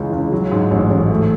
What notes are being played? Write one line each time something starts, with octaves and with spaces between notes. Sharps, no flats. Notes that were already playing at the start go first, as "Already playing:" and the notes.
Already playing: C#2 C#3 E3
C#2
F#3
G#2
A1
A1
A3